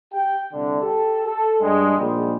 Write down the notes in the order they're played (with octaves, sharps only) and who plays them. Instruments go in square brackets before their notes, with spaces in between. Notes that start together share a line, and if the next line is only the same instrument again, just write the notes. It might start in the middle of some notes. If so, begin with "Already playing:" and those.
[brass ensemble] G4 G5
C2 D3
G4 A4
A4
G2 G#3
A#1 G#2 G3 G#3